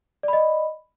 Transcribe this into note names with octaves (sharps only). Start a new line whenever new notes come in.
D5 D#5 B5